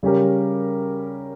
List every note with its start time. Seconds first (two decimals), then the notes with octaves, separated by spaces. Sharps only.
0.03 C#3 G3 C#4 G4 A#4